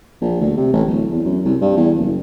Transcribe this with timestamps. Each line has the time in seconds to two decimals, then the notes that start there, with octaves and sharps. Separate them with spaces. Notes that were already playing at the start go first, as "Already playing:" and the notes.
0.21 A#1
0.41 D2
0.57 C3
0.73 A1
0.88 D1
1.11 E2
1.25 F#2
1.45 C2
1.61 G2
1.77 E2
1.97 F#1